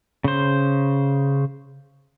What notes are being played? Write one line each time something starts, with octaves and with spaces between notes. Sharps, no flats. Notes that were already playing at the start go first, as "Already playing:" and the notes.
C#3 C5